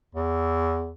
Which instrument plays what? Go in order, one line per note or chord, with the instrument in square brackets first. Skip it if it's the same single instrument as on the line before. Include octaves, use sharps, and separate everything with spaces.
[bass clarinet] E2